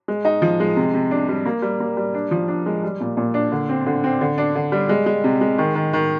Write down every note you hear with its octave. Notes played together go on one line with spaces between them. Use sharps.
G#3
D#4
F3
G#3
C3
C3
D4
G3
A#3
G3
A#3
G3
D4
F3
D4
G#3
G3
A#2
A#2
D4
D3
C4
D3
C4
D3
D4
D3
G3
G#3
G#3
C3
G#3
D#3
D#3
D#3